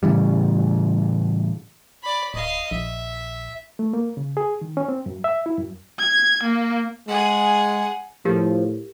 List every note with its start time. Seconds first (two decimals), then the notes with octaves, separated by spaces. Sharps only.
0.03 A2 C#3 E3 G3
2.04 D5 B5
2.34 D1 D#5 F5
2.71 A#1 E5
3.79 A3
3.94 A#3
4.17 C#3
4.37 G#4
4.61 D#3
4.77 C#4
4.88 C4
5.06 F#2
5.24 E5
5.46 E4
5.58 F#2
5.99 G#6
6.44 A#3
7.08 G#3 G#4 F#5
8.25 A2 F3 G4 A#4